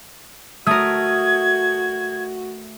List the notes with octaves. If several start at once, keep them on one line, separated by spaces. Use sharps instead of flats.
A3 F#4 A#4 D#6 G#6